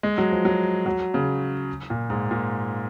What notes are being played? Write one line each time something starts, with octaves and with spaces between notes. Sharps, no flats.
G#3
F#3
F3
F#3
F#3
C#3
A#2
G#2
A#2